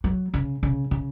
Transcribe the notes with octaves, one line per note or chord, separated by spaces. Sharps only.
F#3
C#3
C#3
C#3